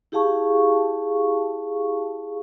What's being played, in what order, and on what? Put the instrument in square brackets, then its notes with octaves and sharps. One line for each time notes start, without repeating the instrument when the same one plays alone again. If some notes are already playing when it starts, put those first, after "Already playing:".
[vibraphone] E4 G4 G#4 F5 A5 C#6